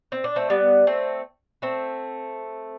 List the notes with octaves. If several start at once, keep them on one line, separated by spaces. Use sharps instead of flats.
C4
D4
A3 C4
G3 B3
A3 C4
A3 C4